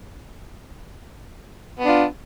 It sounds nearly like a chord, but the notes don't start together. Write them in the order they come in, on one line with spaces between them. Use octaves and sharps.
B3 D4 F4